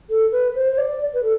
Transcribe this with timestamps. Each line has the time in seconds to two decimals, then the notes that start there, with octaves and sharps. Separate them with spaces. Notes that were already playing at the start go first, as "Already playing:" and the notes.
0.09 A4
0.31 B4
0.55 C5
0.72 C5
0.78 D5
1.13 B4
1.22 A4